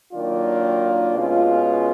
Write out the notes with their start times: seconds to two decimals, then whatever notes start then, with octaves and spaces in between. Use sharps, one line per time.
0.13 D#3 F#3 A#3 D4 F4
1.14 B2 G#3 C#4 F4